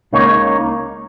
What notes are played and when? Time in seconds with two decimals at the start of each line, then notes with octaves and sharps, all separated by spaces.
0.13 C#2 C#3 A#3 D#4 C#5